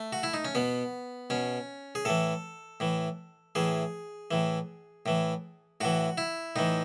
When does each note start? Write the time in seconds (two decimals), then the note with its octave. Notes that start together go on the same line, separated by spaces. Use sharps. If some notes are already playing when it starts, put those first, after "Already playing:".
Already playing: A3
0.13 F#4
0.23 E4
0.34 D#4
0.45 C#4
0.55 B2 B3
1.30 B2 C#4
1.95 G#4
2.05 A2 E3 A4
2.80 A2 E3
3.55 A2 E3 G#4
4.31 A2 E3
5.06 A2 E3
5.81 A2 E3 F#4
6.18 E4
6.56 A2 E3 D#4